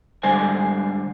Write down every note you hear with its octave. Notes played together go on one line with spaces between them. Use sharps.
G#2 D3 G3 C5 G#5